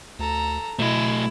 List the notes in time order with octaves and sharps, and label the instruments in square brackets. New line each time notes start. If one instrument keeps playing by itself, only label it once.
[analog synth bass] D2 [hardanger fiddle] A4 A#5
[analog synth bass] B2 [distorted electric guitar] A3 D#5 [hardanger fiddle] E4